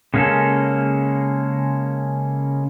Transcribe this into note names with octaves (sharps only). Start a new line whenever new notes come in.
C#3 G#3 A#3 C#4 A4